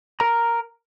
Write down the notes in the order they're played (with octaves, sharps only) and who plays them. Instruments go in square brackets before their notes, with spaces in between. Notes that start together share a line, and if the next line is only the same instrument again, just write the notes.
[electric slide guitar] A#4 A#5